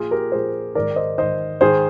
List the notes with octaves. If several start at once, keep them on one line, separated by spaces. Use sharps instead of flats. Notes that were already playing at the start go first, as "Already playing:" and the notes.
Already playing: A#2 F3 F4 G#4
G4 A#4
A#2 F3 G#4 C5
G#2 D#3 A#4 D5
C5 D#5
G#2 D#3 C5 D#5
G#2 D#3 G#4 C5